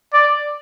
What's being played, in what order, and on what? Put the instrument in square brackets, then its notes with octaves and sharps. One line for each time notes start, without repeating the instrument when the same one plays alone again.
[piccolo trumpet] D5